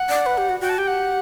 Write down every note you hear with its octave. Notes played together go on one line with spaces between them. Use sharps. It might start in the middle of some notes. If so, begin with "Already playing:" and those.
Already playing: F#5
D5
B4
G4
F#4
F#4 G5
A5
G4 G5
F#5